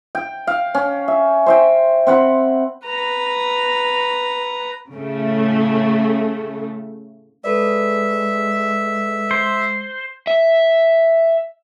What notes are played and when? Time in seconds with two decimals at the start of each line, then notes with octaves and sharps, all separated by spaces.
0.15 G5
0.47 F5
0.75 C#4
1.08 E5
1.46 C5 E5 G5
2.07 C4 F#5 B5
2.86 B4 A#5
4.94 A2 C#3 A3
7.44 G#3 A4 B4 D5 E5
9.31 C5
10.27 E5